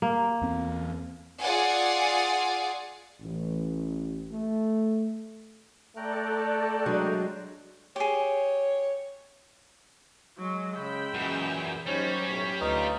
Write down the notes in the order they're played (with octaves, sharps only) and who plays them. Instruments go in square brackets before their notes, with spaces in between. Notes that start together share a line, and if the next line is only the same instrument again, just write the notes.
[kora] A#3
[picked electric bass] E2 C4
[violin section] F4 G#4 D5 F#5 G#5
[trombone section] A1
A3
[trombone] A3 [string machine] A4 D5 [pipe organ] G5 A#5 F#6
[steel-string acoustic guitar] F#3 G#3 D4
[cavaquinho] G4 G#4 [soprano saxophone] C#5
[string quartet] F#3 [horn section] G#3
[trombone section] C#3 [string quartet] G5 B5 E6
[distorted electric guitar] F#2 [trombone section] A#2 E3 G#4
[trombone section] D#2 D#4 C5 [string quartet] F#3 C#4 [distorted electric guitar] G3 [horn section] C#5
[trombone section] B1 F#2 A2
[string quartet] D2 [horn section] C#4 D#4 F4 [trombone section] B4